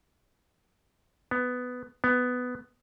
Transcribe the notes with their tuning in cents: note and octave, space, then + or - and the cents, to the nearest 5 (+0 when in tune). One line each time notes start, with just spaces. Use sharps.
B3 +10
B3 +10